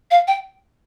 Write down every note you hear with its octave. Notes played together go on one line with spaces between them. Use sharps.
F5
G5